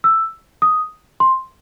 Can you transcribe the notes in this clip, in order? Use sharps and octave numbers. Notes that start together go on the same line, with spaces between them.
E6
D#6
C6